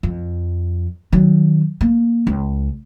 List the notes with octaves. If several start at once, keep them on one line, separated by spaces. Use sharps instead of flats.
F2
D#3 F#3
A#3
C#2